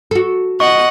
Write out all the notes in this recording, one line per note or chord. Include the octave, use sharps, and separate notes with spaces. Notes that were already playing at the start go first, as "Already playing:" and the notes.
F#4 A4
D#5 F#5 C#6